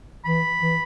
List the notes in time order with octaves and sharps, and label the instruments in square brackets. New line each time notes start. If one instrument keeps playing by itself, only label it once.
[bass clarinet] E3 [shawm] B5
[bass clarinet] E3